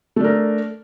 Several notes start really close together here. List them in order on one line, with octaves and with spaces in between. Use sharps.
A3 D4 A#4